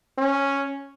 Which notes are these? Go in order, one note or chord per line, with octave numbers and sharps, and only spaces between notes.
C#4